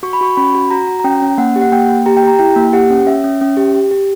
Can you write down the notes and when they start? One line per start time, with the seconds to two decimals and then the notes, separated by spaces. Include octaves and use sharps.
0.03 F#4 C#6
0.13 B5
0.21 F#4 C#6
0.37 C#4 B5
0.54 F#4
0.71 F#4 A#5
0.87 F#4
1.00 A#5
1.04 C#4 G5
1.22 C#4
1.38 A#3 F#5
1.56 G4
1.62 F#5
1.72 A#3 G5
1.89 A#3
2.06 G4 A#5
2.17 G5
2.23 G4 A#5
2.39 E4 G5
2.56 A#3
2.73 G4 F#5
2.90 C#4
3.06 C#4 E5
3.24 C#4
3.41 C#4
3.57 G4
3.75 G4
3.91 G4